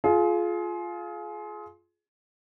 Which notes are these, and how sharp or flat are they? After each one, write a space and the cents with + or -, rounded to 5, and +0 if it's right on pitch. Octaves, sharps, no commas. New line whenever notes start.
F4 +0 G#4 +30